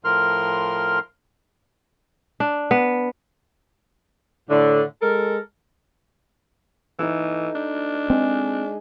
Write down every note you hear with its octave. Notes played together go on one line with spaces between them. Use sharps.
A2 F3 A#4 C6 F6
D4
B3
A2 D3
G#3 A4 A#4
E3 D#4 A4
D4
G#3 C4